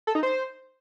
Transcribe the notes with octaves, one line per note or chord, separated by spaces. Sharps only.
A4
D#4
C5